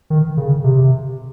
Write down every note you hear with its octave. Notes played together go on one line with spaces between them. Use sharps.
D#3
C#3
C3